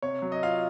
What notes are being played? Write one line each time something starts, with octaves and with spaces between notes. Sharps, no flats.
C3 C#5
F#3
D#5
F4 F5